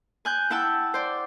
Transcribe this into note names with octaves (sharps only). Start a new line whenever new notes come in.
G#5 F#6 G6
E4 F#5 G5 A5 E6
C5 D5